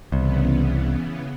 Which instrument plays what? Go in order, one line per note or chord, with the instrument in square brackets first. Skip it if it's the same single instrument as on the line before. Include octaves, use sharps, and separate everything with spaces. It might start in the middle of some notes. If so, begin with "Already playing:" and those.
[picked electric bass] C2 [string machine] C#3 E3 B3